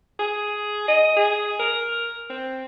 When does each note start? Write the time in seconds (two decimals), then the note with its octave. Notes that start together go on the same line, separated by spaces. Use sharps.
0.19 G#4
0.88 D#5
1.17 G#4
1.60 A#4
2.30 C4